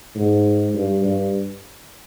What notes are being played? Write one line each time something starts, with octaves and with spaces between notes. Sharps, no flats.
G#2
G2
G2